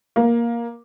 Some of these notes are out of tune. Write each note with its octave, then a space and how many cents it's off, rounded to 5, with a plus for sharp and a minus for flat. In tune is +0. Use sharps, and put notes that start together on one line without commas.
A#3 +10